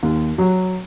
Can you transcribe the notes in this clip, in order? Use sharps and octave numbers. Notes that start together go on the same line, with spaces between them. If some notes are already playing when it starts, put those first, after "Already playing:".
D#2
F#3